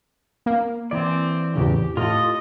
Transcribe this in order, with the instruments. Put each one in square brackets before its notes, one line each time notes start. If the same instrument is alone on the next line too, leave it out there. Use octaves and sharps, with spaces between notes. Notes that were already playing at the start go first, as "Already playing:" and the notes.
[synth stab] A#3
[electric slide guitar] E3 D5 [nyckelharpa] C4
[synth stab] E2 A2 C#3 [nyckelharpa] G4
[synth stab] A2 [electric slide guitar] F4 A4 [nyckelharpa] D#5